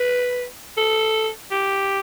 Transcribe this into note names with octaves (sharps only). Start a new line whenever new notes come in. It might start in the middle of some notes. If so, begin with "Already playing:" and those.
Already playing: B4
A4
G4